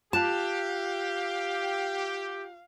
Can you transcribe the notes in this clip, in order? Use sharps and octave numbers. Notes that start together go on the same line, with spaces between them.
F4 G4 F5 A5 F#6 F7